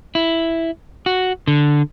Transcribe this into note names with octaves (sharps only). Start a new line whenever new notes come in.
E4
F#4
D3